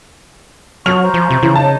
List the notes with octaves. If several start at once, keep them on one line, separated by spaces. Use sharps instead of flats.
F#3 A5 C#6 F6 F7
C5 A#5 C#6
F3
C3
C#3 E3
D#4 C#5 A5